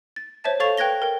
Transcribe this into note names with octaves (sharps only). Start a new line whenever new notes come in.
A6
C5 C#5 E5 A5 A6
A4 C#5 F5 C#6 A6 F7
B4 G5 F#6 G#6 A#6 G7
A#4 G5